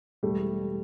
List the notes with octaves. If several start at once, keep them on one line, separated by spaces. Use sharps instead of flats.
E1 G3 A3